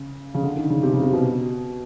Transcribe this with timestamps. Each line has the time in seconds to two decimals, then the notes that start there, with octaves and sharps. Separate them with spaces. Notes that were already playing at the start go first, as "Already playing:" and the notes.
Already playing: C#3
0.35 C#3
0.43 D3
0.57 D#3
0.70 C#3
0.83 C3
0.93 C#3
1.03 C3
1.13 B2